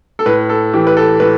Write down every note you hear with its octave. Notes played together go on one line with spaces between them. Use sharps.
A4
A2 B4
A4
E3 G4
B4
A4
A2 B4